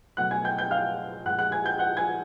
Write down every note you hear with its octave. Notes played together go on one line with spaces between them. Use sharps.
B2 F#3 A3 F#5 F#6
G#5 G#6
G5 G6
G5 G6
F5 F6
A#2 F3 G#3 F#5 F#6
F#5 F#6
G#5 G#6
G5 G6
F#5 F#6
G#5 G#6